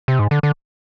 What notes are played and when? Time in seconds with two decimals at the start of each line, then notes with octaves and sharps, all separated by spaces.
0.08 C3
0.19 G#2
0.31 D3
0.43 D3